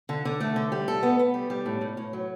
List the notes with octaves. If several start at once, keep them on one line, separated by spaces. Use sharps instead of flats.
D3
D3
A3
D3
G3
A4
B3
B3
G3
G3
A2
A2
A2
F#3